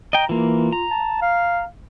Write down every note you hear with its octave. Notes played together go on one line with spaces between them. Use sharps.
D#5 G5 A#5
E3 A#3 F4
A#5
A5
F5